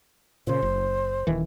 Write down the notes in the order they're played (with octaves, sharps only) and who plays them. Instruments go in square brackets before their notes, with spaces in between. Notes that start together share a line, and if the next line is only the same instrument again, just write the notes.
[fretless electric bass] A#2 C#3 [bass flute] C5
[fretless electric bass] F#1
D#1 D#3 E3